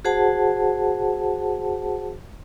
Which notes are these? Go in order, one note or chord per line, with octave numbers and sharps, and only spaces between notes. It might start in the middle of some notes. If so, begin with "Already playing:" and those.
F#4 G#4 C5 F#5 A5